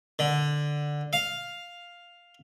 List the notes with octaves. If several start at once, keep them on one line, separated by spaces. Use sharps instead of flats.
D3
F5